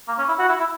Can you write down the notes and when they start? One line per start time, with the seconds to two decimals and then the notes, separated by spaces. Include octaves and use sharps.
0.08 A#3
0.18 C#4
0.28 E4
0.39 F#4
0.49 E4
0.59 E4